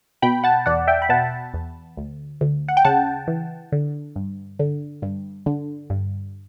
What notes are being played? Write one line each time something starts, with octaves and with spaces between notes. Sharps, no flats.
B2 G5 B5
F#5 A5
E2 D5 F#5
E5 G5
B5
B2 F#5 A5
E2
D2
D2
F#5
G5
C#3 F#5 A5
E3
D3
G2
D3
G2
D3
G2